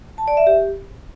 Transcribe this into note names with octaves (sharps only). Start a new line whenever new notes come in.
A5
D5
E5
G4